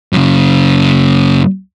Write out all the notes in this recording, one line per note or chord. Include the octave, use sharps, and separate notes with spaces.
F#2 C#3